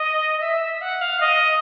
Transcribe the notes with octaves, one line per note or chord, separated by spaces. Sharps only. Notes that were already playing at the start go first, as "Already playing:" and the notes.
Already playing: D#5
E5
E5
F#5
F5
D#5